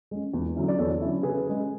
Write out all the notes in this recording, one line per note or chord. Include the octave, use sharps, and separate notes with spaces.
G#3 C#4
E2
D3 F#3 C#4 E4
D5
E2 A4 C#5
D3 F#3 C#4 E4
C#3 G#4 B4
G#3 C#4